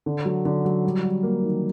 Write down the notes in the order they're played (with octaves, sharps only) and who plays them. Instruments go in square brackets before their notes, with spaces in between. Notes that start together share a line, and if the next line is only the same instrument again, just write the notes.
[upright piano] D3
F#3
D3
F#3
G3
G3
A#3
D#3